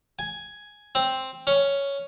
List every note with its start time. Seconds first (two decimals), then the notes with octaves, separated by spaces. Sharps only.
0.19 G#5
0.95 C4
1.47 C#4